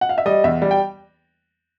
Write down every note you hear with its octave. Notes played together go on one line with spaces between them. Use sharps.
F#5
F5
E5
G3 D#5
E2 E5
G3
G5